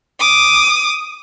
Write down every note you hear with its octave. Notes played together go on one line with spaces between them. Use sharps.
D6 D#6